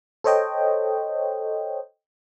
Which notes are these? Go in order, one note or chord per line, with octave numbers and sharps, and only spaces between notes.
A4 C5 C#5 D#5 G5